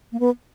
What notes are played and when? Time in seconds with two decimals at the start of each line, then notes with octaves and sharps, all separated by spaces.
0.12 A#3
0.20 B3